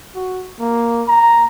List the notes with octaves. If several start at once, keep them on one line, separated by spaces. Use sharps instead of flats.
F#4
A#3
A#5